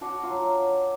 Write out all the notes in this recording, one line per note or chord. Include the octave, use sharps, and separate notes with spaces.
D4 F#4
F4
F#3